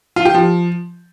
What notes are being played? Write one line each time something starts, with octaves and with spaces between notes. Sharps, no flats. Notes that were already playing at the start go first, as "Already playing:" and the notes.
F4
G4
F3